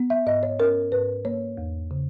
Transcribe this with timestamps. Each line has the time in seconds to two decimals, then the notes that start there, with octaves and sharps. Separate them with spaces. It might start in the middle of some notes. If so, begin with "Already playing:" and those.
Already playing: B3
0.10 E5
0.26 G#2 D#5
0.43 C#5
0.59 C#4 A#4
0.92 G#2 B4
1.25 A#3 C#5
1.57 E2
1.91 C#3